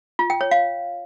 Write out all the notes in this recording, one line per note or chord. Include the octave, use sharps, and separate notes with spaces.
F4
G5
C#5
F5